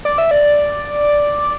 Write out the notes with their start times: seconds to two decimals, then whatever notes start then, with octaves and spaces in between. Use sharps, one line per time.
0.05 D5
0.18 E5
0.31 D5